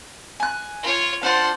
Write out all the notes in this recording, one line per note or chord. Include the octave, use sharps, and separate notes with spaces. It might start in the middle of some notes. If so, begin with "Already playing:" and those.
G#5 F#6
F4 C#5
D4 F4 C5 F#5